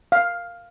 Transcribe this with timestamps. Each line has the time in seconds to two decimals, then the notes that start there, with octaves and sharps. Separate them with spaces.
0.12 F5